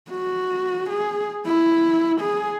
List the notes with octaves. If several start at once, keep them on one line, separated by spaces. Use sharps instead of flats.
F#4
G#4
E4
G#4